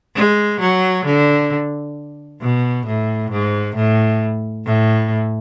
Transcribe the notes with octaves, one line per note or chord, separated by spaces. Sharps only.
G#3
F#3
D3
B2
A2
G#2
A2
A2